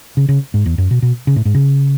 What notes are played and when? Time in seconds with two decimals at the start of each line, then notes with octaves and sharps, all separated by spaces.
0.17 C#3
0.29 C#3
0.54 G#2
0.66 E2
0.78 F#2
0.91 B2
1.02 B2
1.27 C#3
1.36 A2
1.45 G#2
1.55 C#3